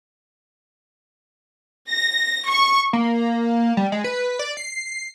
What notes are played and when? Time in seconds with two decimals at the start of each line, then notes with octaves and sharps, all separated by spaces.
1.89 A#6
2.49 C#6
2.93 A#3
3.77 G3
3.92 G#3
4.04 B4
4.39 D5
4.57 C7